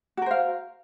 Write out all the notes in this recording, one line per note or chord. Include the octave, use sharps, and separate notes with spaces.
F#4 A#4 C5 F5